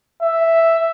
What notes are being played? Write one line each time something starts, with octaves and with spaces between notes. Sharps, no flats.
E5